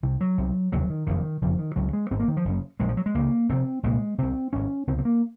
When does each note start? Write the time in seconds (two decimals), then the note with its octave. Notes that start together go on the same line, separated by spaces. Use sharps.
0.03 C2 C3
0.21 F#3
0.38 C2 C3
0.72 F1 D#2 C#3 F#3
0.90 D#3
1.07 F#1 F2 C3 D#3
1.41 F#1 F2 C#3 F3
1.59 D#3
1.76 C#2 C#3 F#3
1.93 G#3
2.11 G#1 G#2 C4
2.19 A#3
2.28 D#3
2.37 F3
2.45 F#1 F#2 C#3
2.80 A#1 A#2 G#3
2.89 F3
2.97 F#3
3.06 G#3
3.15 C#2 C#3 A#3
3.49 F1 F2 C3 C4
3.83 C2 A#2 G#3
4.18 C2 C3 C4
4.53 G#1 G#2 C#4
4.87 C#2 C3 C4
4.99 C4
5.05 A#3